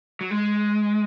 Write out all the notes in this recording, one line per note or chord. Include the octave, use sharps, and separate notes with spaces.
F#3
G#3